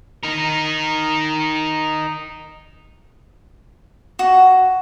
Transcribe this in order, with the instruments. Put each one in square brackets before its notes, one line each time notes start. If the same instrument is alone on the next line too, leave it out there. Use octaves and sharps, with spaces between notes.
[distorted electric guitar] D#4 A#4
[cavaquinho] F#4